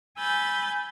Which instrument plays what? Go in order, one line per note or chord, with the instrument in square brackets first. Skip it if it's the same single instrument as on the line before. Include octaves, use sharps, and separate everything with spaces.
[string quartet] G#5 B5 E6 G6 A6